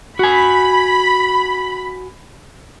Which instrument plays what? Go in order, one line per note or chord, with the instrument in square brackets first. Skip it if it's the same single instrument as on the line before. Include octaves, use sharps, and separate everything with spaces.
[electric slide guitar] F#4 G#5 [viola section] B5